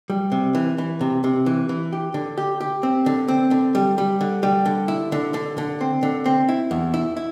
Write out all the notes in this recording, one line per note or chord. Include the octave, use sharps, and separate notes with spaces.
G3
C3
E3
E3
C3
C3
E3
E3
G4
D3
G4
G4
C4
D3
C4
D3
G3
G3
D3
G3
D3
E4
D3
D3
D3
C4
D3
C4
E4
E2
E4
E4